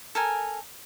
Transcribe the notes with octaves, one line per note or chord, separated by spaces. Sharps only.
A4 A#4 G#5